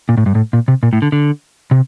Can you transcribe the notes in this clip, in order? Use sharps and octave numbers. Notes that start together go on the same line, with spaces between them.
A#2
A2
G2
A2
A#2
C3
A#2
A2
D3
D3
C3